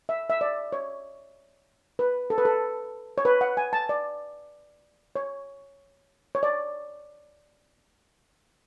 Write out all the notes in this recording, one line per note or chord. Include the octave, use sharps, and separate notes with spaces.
E5
E5
D5
C#5
B4
A4
B4
A4
C#5
B4
F#5
G#5
A5
D5
C#5
C#5
D5